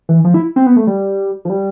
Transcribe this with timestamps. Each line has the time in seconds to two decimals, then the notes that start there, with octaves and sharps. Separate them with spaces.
0.09 E3
0.24 F3
0.34 E4
0.56 C4
0.66 B3
0.76 A3
0.87 G3
1.45 F3
1.50 G3